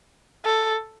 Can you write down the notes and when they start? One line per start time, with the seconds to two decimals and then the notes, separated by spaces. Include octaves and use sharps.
0.45 A4